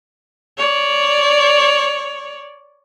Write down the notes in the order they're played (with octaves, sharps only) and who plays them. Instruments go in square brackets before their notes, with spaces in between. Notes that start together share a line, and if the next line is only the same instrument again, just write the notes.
[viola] C#5 D5